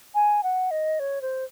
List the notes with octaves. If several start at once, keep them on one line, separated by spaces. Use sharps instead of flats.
G#5
F#5
D#5
C#5
C5